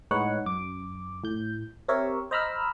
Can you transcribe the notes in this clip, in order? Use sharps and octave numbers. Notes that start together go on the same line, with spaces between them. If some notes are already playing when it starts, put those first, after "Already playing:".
A2 G#3 D#4 B4 C#5 F#5
F#2 D6
A2 G6
C4 G4 A#4 C#5 E5
C5 D#5 A#5 B5 E6 F6